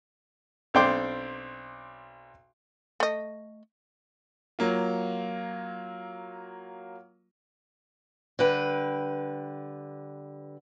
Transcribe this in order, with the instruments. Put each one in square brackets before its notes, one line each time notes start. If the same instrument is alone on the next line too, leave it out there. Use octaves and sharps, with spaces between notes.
[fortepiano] B1 C4 D4 G5 C6 D6
[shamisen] A3 D#5
[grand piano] F#3 A#3 F4
[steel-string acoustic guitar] D3 G3 B4 G5